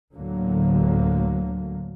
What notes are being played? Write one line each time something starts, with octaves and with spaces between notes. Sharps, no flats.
D2 A2 D3 F#3 A#3